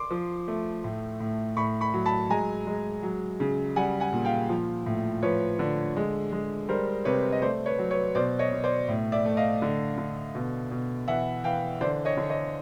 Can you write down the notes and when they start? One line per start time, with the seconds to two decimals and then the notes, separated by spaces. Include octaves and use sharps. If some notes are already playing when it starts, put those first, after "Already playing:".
Already playing: C6 D6
0.11 F3
0.48 A3
0.84 A2
1.20 A2
1.57 A2 B5 C#6
1.81 B5 C#6
1.94 F#3
2.06 A5 B5
2.30 G#3 G#5 A#5
2.67 G#3
3.03 F#3
3.40 C#3
3.76 G3 F#5 G#5
4.00 F#5 G#5
4.13 A#2
4.25 F5 G5
4.49 F3
4.86 A2
5.23 F3 B4 C#5
5.59 D3
5.96 G#3
6.32 G#3
6.69 G3 A#4 C5
7.05 C3 B4 C#5
7.32 D#5
7.42 A3 C5 D5
7.66 B4 C#5
7.79 F#3
7.91 B4 C#5
8.15 B2 C5 D5
8.39 C#5 D#5
8.52 B2
8.64 C5 D5
8.88 A2
9.12 D5 E5
9.25 A3
9.37 D#5 F5
9.62 D3
9.98 D3
10.35 B2
10.71 B2
11.08 E3 E5 F#5
11.44 E3 F5 G5
11.81 D3 C5 D5
12.05 C#5 D#5
12.17 D3
12.30 C#5 D#5